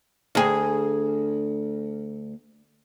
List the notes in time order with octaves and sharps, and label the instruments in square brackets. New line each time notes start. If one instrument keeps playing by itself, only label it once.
[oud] D2 G#4